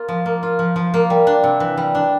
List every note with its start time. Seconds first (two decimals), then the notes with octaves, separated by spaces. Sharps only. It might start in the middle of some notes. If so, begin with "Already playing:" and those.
Already playing: A#3 F4
0.09 F3
0.26 A#3
0.43 F4
0.59 F3
0.76 F3
0.94 A#3
1.10 G3
1.27 D4
1.44 C3
1.60 E3
1.77 G3
1.95 D4